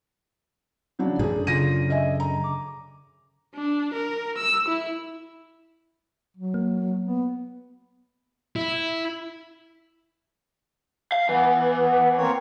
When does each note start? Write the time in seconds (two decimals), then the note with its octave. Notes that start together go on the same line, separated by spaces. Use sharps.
0.99 C#3 F#3 D4
1.19 F#2 D3 G#4
1.47 C#3 F4 A#6 D#7
1.90 D#5 E5 G#5
2.20 A#5
2.44 D6
3.55 D4
3.94 A#4
4.38 E6
4.68 E4
6.37 F#3
6.54 A#3
7.04 B3
8.56 E4
11.12 F5
11.29 E3 B3
12.17 A#3 C4 C#5